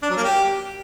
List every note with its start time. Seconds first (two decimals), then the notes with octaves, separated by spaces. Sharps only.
0.02 D4
0.10 F#3
0.17 A#3
0.24 G4